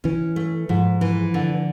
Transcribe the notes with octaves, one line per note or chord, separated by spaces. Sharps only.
E3 C#4
A3
G#2 F3
E3
D3